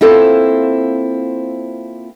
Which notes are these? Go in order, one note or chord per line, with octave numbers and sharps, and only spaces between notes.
A#3 C4 E4 F4 A4 C5